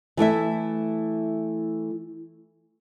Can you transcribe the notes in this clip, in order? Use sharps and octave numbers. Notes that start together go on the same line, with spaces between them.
E3 A3 E4 E5